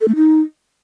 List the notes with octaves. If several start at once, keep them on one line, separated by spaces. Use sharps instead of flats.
A4
A3
D#4